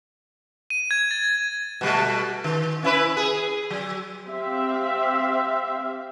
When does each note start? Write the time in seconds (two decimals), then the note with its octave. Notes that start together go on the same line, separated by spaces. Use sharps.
0.70 D#7
0.91 G#6
1.11 A6
1.81 B2 G3 A3
2.44 D#3
2.83 C#4 E4 B4
3.17 G#4
3.70 F#3
4.26 C4 G4 E5 F5